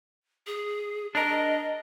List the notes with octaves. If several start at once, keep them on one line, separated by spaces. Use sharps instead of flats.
G#4
D4 A#4 D#5